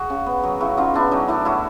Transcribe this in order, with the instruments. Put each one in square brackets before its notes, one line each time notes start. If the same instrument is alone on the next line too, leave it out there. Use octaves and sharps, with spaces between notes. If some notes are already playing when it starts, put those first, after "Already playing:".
Already playing: [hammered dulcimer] F#4 G#4
C#3
B3
F#3
C#3 E4 F#4
C#3 D#4 F4
B3 D4 E4
F#3 C#4 D#4
A2 D4 E4
A2 E4 F#4